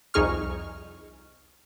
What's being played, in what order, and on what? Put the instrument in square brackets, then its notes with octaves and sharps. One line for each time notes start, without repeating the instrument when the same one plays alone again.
[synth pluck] C2 F2 D#4 G#4 C#6 F6